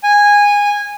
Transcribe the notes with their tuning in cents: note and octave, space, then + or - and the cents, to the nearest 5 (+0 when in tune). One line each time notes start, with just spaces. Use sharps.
G#5 -15